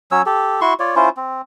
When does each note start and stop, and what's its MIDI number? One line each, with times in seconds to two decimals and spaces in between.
0.11 0.22 54
0.11 0.22 61
0.11 0.22 73
0.11 0.22 88
0.26 0.60 67
0.26 0.60 69
0.61 0.74 64
0.61 0.74 66
0.61 0.74 84
0.61 0.74 85
0.80 0.95 65
0.80 0.95 73
0.80 0.95 74
0.96 1.09 61
0.96 1.09 64
0.96 1.09 65
0.96 1.09 72
1.17 1.41 60